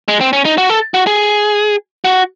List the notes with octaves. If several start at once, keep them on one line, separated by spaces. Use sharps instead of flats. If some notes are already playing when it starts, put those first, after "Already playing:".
G#3
C4
C#4
D#4
F#4
A4
F#4
G#4
F#4